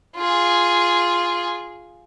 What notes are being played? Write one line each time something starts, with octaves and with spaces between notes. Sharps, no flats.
F4 G#4